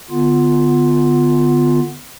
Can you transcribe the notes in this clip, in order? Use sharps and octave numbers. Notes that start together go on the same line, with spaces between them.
D3 B3 F4